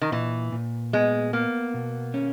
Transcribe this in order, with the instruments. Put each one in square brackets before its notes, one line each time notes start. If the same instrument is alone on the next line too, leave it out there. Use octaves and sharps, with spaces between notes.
[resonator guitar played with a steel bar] D#3
[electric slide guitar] A#2 [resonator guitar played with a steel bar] E3
[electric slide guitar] A#2
[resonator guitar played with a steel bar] G#3 [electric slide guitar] B3
[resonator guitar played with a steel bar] A#3 [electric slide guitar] B3
[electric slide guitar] B2
C#4